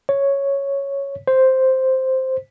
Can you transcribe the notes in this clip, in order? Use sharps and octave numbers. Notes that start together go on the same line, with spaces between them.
C#5
C5